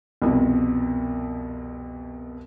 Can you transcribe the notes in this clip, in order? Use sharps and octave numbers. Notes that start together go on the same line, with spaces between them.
C2 F2 B2